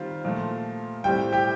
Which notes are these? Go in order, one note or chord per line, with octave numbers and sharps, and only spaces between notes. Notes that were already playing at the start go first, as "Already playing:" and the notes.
Already playing: D#3 G3 C4 F4
A#2 F3 A3
A2 G3 C4 G5
G4 G5